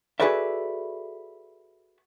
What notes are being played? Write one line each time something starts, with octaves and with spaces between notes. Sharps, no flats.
F#4 G#4 A4 B4 D5 E5